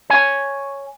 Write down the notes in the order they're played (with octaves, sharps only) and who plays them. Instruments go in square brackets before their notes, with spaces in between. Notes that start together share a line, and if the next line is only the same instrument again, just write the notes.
[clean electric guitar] C#5 G#5